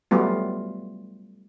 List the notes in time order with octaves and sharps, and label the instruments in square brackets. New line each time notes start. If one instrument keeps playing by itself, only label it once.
[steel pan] F#3 G3 A3 B3 F4